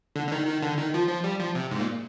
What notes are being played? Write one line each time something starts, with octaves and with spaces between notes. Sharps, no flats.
D3
D3
D#3
D#3
D3
D#3
F3
F3
G3
F3
C3
G#2
A#2